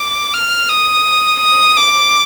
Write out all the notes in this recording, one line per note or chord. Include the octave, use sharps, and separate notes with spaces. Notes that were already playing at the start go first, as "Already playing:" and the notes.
Already playing: D6
F6
D#6
D#6
D6